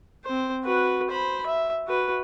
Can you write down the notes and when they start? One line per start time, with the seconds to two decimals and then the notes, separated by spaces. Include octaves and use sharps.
0.25 C4 C5
0.65 F#4 B4
1.10 C5 B5
1.46 E5
1.87 F#4 B4